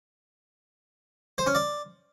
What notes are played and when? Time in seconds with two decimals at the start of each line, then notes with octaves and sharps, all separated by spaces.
1.38 C5
1.46 C#4
1.55 D5